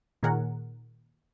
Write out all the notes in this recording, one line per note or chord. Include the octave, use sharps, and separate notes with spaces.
A#2 D#3 G#4 A#4 C#5 F#5